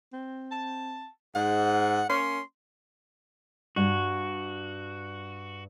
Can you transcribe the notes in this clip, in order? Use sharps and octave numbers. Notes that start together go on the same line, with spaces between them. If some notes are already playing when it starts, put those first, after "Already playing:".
C4
A5
G#2 F#5
A#3 C#4 C6
G2 F#4